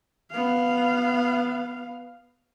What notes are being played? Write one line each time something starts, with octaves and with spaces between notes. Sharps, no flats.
B3 F5